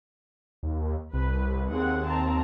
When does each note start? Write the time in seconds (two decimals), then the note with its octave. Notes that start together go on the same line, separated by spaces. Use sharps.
0.63 D#2
1.13 C2 B4
1.70 D#2 C4 G#4 F#5
2.04 C4 A5 A#5